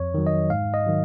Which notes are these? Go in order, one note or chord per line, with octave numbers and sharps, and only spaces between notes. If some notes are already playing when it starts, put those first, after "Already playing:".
Already playing: F2 C#5
D#3 F#3
D#5
G#2 F5
D#5
D#3 F#3